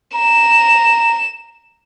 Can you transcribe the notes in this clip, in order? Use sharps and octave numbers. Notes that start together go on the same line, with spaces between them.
A#5 E7